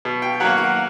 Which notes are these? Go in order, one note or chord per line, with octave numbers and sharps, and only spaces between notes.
B2
G5
F#3 A#3 F#5
F#5